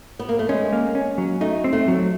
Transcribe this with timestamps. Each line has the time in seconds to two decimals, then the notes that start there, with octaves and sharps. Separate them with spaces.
0.19 B3
0.29 A#3
0.39 A3
0.49 G#3 C#4
0.73 A#3
0.95 C#4
1.18 F#3
1.41 A3 D#4
1.64 C4
1.73 A3
1.88 F#3